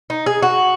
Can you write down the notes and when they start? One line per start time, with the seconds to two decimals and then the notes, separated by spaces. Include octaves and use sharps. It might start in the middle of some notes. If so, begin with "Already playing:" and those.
0.10 D#4
0.26 G#4
0.42 F#4